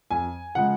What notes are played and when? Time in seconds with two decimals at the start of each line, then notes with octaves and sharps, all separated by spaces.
0.11 F2 G#5
0.55 C#3 F3 G#3 F#5